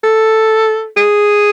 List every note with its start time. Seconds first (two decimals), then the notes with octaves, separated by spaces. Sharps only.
0.04 A4
0.97 G#4